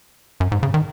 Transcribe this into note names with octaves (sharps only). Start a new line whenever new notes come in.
F#2
G#2
C#3
D#3